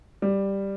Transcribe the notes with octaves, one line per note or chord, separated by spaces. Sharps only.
G3